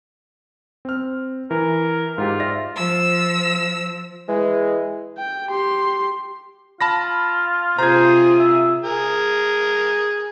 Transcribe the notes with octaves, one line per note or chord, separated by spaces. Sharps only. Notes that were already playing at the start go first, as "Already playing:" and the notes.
C4 F6
E3 A#4
G#2 F4 G4
D5 E5 A#6
F3 E6
E3 G#3
G5
G4 C6
F4 A5 B5 A#6
C3 F4 G#4 C5 A#5 G#6
E5
G#4 A#4